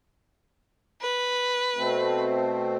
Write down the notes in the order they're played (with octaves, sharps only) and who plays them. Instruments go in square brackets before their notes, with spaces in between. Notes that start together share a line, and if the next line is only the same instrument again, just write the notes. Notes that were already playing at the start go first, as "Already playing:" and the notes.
[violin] B4
[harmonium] B2 A3 C4